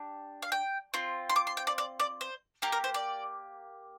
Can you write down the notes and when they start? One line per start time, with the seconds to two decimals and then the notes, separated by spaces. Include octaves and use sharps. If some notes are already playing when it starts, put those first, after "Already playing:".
Already playing: D4 G4
0.42 F5
0.52 G5
0.94 C4 F4
1.29 C6
1.36 D6
1.47 C6
1.57 G5
1.67 D5
1.78 D5
2.00 D5
2.21 C5
2.62 A#3 G4 A#4
2.72 A#4
2.84 C5
2.94 D5